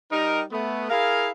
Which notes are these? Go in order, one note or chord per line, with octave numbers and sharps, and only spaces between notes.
G3 D#4 A#4
A3 B3
E4 G#4 A#4 F5